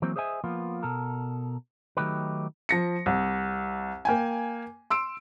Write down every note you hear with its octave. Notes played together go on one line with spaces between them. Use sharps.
E3 F#3 A#3 C4
G#4 C5 D#5 E5 G#5
F3 A#3 B3 F4
B2 A4 A#4
D#3 F#3 A3 D#4 G4 B4
F3 A#6 C#7
C2
A#3 G5 G#5
C6 E6 D7